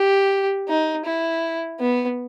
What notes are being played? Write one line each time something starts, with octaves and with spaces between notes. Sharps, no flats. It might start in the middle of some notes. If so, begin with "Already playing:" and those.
Already playing: G4
D#4
E4
B3